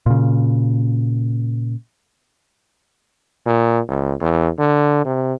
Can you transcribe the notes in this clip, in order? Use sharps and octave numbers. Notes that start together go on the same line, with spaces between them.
A#2 C#3
A#2
C#2
E2
D3
C3